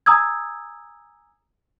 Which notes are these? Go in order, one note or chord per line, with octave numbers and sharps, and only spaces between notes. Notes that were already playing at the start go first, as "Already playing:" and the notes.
G#5 A#5 D#6 E6 G#6